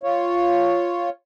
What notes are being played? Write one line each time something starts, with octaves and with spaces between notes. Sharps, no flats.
F4 C#5